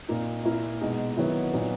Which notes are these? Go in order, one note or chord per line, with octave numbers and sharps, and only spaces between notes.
A#2 A#3 D#4
A#2 A#3 E4
B2 G#3 D#4
D#3 F#3 B3 E4
A#2 F#3 B3 D#4